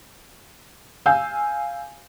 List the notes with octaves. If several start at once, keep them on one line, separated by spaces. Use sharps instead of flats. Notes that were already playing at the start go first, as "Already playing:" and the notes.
F5 G#5 E6 G6